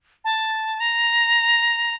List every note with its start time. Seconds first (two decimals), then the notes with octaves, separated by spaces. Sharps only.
0.25 A5
0.80 A#5